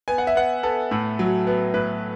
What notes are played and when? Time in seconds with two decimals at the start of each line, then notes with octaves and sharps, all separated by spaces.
0.08 B3 G#5
0.18 F#5
0.27 E5
0.35 B3 F#5
0.63 B3 A4
0.91 A2
1.19 F#3
1.47 B3
1.74 A2 B4